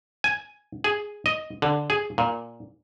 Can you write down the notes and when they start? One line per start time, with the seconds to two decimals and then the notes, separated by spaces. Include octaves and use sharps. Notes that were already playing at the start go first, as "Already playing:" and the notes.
0.24 G#5
0.84 G#4
1.26 D#5
1.62 D3
1.90 G#4
2.18 A#2